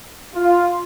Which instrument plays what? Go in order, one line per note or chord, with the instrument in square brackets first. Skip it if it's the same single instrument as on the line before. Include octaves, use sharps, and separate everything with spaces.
[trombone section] F4